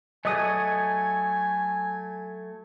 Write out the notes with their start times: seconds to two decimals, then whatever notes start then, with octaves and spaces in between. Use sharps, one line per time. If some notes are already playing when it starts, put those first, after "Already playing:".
0.25 F#3 A3 D#5 G#5 D#6